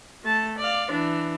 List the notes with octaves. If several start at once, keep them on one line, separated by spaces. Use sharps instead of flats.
A3 A5
D5 F5
E3 D4